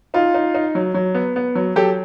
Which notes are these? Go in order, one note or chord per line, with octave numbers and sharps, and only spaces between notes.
D#4 F4
D#4
D#4
F#3
F#3
B3
B3
F#3
F#3 G4 A4